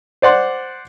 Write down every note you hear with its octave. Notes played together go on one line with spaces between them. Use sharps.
C5 D5 F#5 C6